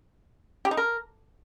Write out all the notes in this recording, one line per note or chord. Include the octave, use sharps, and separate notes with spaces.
G4
D#4
A#4